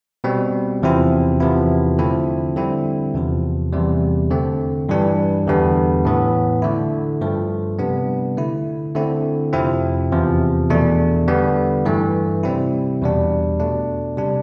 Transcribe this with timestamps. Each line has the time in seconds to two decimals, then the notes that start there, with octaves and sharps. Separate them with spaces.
0.24 B2 G3 C4
0.82 E2 C3 F3 C4 E4
1.40 E2 C3 F3 B3 E4
1.98 D3 F3 A3 C4 E4
2.56 D3 G3 C4 E4
3.14 E2 C3 F3
3.73 E2 C3 G3
4.31 D3 A3 C4
4.89 G2 E3 G3 D4
5.47 E2 D3 G3 B3 D4
6.05 A2 E3 B3
6.62 D3 A3 E4
7.21 G2 F3 A3
7.79 C3 G3 B3 D4
8.37 D3 A3 E4
8.95 D3 A3 C4 E4
9.53 F2 C3 F3 C4 E4
10.12 E2 C3 F3
10.70 E2 B2 A3 D4
11.28 D3 G3 B3
11.85 G2 E3 A3
12.43 C3 G3 C4 E4
13.02 E2 B2 G3 D4
13.60 B2 A3 D4
14.17 C3 G3 D4